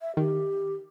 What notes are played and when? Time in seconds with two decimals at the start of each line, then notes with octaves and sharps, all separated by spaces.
0.01 E5
0.17 D#3 G4